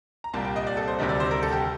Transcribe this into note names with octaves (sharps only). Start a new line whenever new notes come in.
A#5
C2 A#2 G3 A#3 A5
G5
D#5
D5
A4
C5
D2 C3 D#3 G3 D4 D#5
D5
C5
A#4
A4
G4